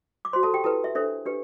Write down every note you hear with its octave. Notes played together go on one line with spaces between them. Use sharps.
D6
F#4 C5 C6
A4 A5
G4 G5
E4 A4 B4 A5
E5
D4 A4 C5 E5
D4 G4 B4